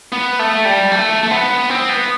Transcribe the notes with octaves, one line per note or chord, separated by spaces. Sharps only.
B3
A3
G3
A3
A3
B3
C4
B3